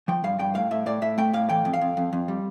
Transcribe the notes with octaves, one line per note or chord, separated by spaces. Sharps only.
F3 G5
G2 F5
G2 G5
A2 F5
A2 E5
A2 D5
A2 E5
A3 G5
A2 F5
E3 G5
F2
F5
F2
F2
F2
G3